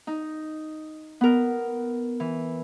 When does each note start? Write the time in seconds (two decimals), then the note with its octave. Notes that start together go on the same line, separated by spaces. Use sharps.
0.07 D#4
1.21 B3 A#4
2.20 E3